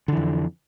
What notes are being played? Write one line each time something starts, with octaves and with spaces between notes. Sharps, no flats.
F2 D3 E3